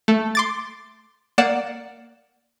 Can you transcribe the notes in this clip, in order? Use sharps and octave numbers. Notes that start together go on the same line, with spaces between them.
A3
C6 D6 A6
A#3 D5 F#5 E7